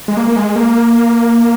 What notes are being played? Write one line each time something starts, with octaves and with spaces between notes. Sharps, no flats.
G#3
A#3
A#3
G#3
A#3